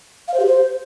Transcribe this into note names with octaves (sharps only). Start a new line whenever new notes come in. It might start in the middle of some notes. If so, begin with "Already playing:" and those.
F5
C5
G4
C5